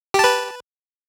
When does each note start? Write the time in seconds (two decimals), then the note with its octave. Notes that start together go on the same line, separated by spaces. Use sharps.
0.14 G4
0.19 A5
0.24 B4